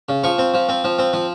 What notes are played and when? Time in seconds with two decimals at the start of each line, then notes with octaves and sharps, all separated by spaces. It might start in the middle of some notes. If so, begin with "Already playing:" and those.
0.09 C#3
0.24 F3 C#6
0.38 C4
0.54 F3
0.69 C4
0.84 F3
0.99 C4
1.13 F3